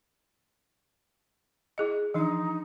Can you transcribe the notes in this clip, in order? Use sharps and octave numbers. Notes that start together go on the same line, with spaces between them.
E4 G#4 D#5
E3 F3 D4 D#4